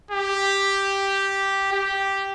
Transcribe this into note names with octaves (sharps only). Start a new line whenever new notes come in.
G4
G4